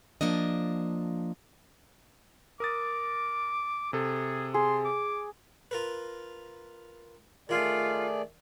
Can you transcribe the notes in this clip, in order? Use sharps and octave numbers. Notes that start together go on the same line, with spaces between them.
F3 A#3 D4 D#5
A#4 D6 D#6 A6
C3 G#4 A4
G#4 C6
D6
F4 A#4 B4
D#3 A3 D4 F4 G#4 D5 G#5